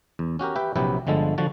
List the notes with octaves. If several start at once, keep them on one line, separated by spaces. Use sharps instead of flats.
E2
C#4 F#4 G4 A#4
G4 B4 E5 G5
A#1 C3 F#3 E4 G4 B4
G1 D3 F3 G#3 A4
D3 F3 F#4 A5